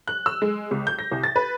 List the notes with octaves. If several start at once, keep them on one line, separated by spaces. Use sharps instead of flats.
F#6
E6
G#3
C#2
G6
A#6
C2
A6
B4